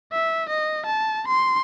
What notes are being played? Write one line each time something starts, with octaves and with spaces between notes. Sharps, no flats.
E5
D#5
A5
C6